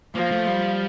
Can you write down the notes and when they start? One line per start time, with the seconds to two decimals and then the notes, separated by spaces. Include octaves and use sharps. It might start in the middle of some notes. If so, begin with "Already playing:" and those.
0.15 F3 A#3
0.31 A3
0.47 G3